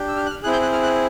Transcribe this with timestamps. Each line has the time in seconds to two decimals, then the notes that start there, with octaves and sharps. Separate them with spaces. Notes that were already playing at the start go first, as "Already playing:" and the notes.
Already playing: D4 G4
0.08 E6
0.16 F6
0.26 F#6
0.30 F6
0.43 C4 E4 G#4 F#6
0.53 G6
0.62 F#6
0.72 F6
0.83 F#6